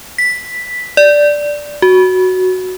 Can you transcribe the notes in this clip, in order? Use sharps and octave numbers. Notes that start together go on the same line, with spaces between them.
B6
D5
F#4